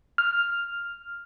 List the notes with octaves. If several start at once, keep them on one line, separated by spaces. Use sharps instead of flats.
F6